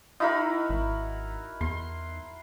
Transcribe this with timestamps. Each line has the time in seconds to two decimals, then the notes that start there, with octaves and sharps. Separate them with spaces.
0.20 D#4 E4 F#4 A#4 B5
0.70 G#1
1.61 E2 C6